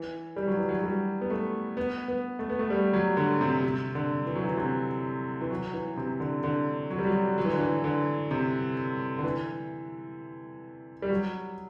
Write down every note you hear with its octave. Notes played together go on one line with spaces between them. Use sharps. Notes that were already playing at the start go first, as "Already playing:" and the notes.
Already playing: E3
G3
F#3
E3
F#3
F#3
G3
B3
A3
B3
B3
A3
B3
A3
G3
F#3
D3
C3
C3
D3
E3
F#3
E3
C3
E3
F#3
E3
C3
D3
D3
F#3
G3
F#3
F#3
E3
D3
E3
D3
C3
D3
E3
G3
F#3